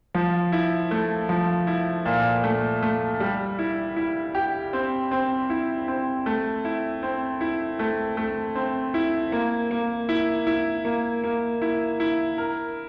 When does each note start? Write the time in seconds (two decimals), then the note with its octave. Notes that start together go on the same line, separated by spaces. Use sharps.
0.15 F3
0.52 E4
0.91 A3
1.29 F3
1.67 E4
2.06 A#2
2.44 A3
2.82 A3
3.20 G3
3.59 E4
3.96 E4
4.35 G4
4.73 C4
5.11 C4
5.50 E4
5.88 C4
6.26 A3
6.65 E4
7.03 C4
7.41 E4
7.79 A3
8.17 A3
8.55 C4
8.94 E4
9.32 A#3
9.71 A#3
10.09 E4
10.47 E4
10.85 A#3
11.24 A#3
11.62 E4
12.00 E4
12.38 A#4